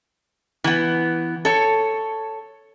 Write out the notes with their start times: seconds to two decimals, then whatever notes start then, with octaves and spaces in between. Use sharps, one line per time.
0.64 E3 B3
1.45 A4 C#5